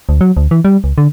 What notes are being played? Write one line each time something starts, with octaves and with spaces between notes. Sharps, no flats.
D2
F#3
D2
E3
G3
C#2
D3